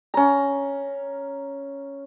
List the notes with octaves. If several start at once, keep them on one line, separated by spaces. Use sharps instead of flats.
C#4 A#5